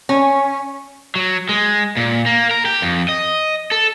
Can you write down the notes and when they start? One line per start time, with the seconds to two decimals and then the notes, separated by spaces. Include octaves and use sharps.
0.09 C#4
1.15 F#3
1.49 G#3
1.97 A#2
2.26 A#3
2.51 A#4
2.65 G4
2.82 F2
3.09 D#5
3.72 A4